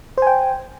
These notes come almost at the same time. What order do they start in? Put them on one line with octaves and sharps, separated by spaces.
C5 G#5 G5